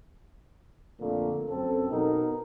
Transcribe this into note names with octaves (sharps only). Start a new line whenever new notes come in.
F2 A#2 D3 A3
F#2 C4 A4
B2 D#4 A#4